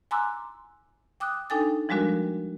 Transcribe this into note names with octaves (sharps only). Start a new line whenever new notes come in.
G#5 A#5 C6 D6 E6 F#6
G5 D6 D#6 F#6
D4 D#4 A4 G5 G#5 A6
F3 G3 G#3 D4 F#4 A#4